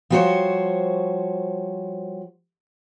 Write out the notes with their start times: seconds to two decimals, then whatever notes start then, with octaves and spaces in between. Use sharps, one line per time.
0.10 F3 G3 F#4 G#4 C5 C#5